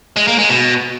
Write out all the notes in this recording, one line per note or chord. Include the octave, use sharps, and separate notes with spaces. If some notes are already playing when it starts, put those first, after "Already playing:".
G#3
A#3
G#3
B2